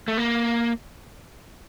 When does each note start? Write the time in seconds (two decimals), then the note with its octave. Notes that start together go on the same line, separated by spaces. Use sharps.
0.08 A3
0.18 A#3